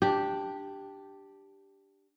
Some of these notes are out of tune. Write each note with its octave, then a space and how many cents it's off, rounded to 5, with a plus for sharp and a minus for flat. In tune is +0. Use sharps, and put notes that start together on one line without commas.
D4 +0 G4 +0